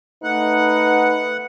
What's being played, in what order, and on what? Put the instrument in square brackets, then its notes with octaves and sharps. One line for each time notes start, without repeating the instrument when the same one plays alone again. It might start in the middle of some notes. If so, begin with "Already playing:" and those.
[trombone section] A3 D#4 B4 [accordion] F#5